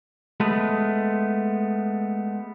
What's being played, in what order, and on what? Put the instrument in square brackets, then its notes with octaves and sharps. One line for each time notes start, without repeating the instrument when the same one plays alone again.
[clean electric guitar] G#3 A3 B3